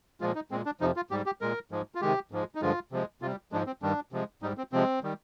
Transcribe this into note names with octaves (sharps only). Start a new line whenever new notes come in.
A#2 F3 G#3 F4
D#4
A#2 G#3 C4
D4
F2 C3 F3 D#4
F4
G#2 G3 G4
G4
A#2 G#3 A#4
G#2 F3 G#3
F4
C3 D#3 G#3 G4
G#2 F3 G#3
D#4
G2 D3 F3 G#3 F4
C3 F3 G#3
C3 G3 F4
G#2 F3 G#3 D4
C4
G2 D#3 G3 D4
C3 F3 G#3
G#2 G3 D#4
C4
C3 F3 G#3 C4
D#3 G3